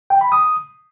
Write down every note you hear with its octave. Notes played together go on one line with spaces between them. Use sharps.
G5
B5
D#6